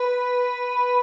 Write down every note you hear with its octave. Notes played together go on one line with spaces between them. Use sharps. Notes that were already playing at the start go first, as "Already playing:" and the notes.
Already playing: B4